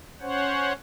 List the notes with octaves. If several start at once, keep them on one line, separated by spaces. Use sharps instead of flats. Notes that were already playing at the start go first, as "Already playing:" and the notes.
C#4 C5 C#5 F#5